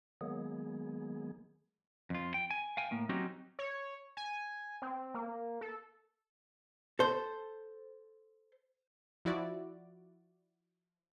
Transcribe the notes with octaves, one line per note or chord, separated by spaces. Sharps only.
D#3 F#3 G#3 A#3 B3 G#4
F2 F4
G5
G#5
F5 G5 G#5
A2 A#3
F#3 C4 C#4 D#4 F#4 G4
C#5
G#5
C4
A#3
A4
A4 C5
F3 E4 F#4 D5